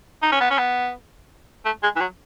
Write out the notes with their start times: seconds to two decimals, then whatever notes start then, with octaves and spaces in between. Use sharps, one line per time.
0.22 D#4
0.32 C#4
0.41 B3
0.50 C#4
0.58 B3
1.65 A3
1.83 G#3
1.96 E3
2.00 F#3